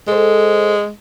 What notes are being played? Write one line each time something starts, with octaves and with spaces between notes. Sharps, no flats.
G#3 A4 C5